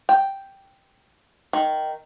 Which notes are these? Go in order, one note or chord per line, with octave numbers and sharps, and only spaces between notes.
G5
D#3